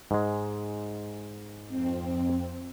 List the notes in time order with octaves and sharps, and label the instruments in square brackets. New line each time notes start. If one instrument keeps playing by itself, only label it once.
[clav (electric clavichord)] G#2 G#3
[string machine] F2 C4